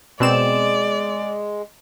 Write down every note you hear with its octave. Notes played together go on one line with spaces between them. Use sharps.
B2 G#3 C4 D5 E7